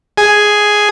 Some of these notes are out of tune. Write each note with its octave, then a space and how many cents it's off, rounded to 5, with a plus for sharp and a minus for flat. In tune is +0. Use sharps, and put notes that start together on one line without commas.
G#4 +5